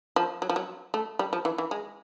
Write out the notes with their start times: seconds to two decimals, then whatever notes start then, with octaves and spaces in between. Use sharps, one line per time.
0.16 F3
0.42 F#3
0.49 F3
0.56 F#3
0.94 A3
1.19 G3
1.33 F3
1.45 E3
1.58 E3
1.71 G#3